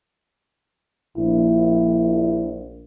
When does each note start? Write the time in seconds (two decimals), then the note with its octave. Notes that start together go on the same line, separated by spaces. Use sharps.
1.18 A#1 E4